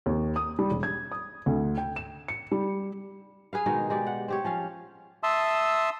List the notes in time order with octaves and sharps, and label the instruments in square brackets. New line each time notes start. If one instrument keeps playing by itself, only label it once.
[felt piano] D#2
D#6
G3
E1
G#6
D#6
D2
G5
E7
C#7
G3
[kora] G#4 B4 F5
B2 D#3 G#3 D#4
G#3 G4 D5
F#5
C4 G4 C#5
F3 C#4 F5
[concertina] E5 A5 C6 D#6 E6